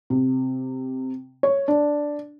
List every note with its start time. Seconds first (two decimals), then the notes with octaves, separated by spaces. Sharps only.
0.10 C3
1.43 C#5
1.68 D4